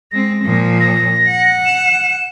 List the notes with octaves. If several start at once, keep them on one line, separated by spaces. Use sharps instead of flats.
G#3 C4 A#6
A#2 F3
A#6
F#5
E7